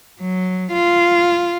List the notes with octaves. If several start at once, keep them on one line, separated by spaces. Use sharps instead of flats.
F#3
F4